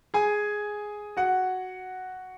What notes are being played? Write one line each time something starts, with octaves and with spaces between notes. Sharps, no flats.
G#4 G#5
F#4 F#5